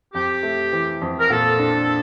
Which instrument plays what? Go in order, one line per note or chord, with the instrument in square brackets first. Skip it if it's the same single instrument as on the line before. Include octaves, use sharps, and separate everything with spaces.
[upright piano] F2 [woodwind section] G4
[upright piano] A3
E3
F2
[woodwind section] A#4
[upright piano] A#2 [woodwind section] A4
[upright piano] D4